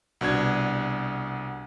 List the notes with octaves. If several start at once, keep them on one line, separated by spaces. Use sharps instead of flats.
C2 B2 D4 G#6